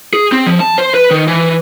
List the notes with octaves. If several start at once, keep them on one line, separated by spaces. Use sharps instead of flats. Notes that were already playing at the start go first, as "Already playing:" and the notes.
G#4
C4
F3
A5
C5
B4
D#3
E3